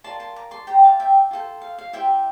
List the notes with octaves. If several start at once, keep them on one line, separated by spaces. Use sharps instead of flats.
F4 A#4 D5 A5 C6
A5 C6
A#5 D6
A5 C6
G4 C5 G5 A#5
F5 A5
E5 G5
F4 A4 C5
F5
F5
E4 G4 C5 E5 G5